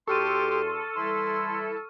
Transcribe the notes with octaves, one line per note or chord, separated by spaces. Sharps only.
E2 F#4 G4 A4 C6 C#6 F6 D#7
E3 G3 E4 C6